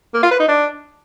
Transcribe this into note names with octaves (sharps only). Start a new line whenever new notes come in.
A#3
F4
B4
D#4
D4